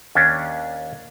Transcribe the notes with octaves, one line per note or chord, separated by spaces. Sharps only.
D#2 C#4 D4